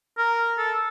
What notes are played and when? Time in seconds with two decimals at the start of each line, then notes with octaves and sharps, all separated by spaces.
0.18 A#4
0.58 A4